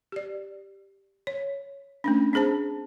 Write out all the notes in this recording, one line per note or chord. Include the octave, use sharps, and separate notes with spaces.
G4 D5
C#5
A3 C#4 D4
C4 D4 G#4 C5 A5